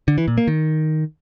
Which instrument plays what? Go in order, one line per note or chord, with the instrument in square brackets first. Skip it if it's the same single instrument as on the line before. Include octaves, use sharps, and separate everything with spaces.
[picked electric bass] D3
E3
A#2
A#3
D#3